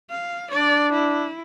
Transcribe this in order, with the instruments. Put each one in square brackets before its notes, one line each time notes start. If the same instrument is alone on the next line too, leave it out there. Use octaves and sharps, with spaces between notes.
[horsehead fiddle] F5
[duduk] D4 [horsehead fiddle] D5
[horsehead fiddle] E4